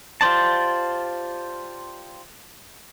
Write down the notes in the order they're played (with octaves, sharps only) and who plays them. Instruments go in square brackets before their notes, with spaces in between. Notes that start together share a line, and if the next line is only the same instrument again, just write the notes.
[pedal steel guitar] F4 G4 C5 D5 A5